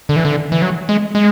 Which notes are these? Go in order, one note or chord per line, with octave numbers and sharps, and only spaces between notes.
D3
E3
D3
E3
F#3
G#3
G#3